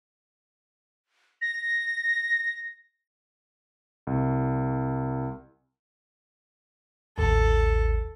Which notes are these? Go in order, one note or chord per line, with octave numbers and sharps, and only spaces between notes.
A#6
C2
A1 D#2 A4